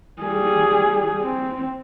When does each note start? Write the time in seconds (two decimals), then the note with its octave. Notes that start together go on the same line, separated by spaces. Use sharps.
0.22 G3 G#4
1.22 C4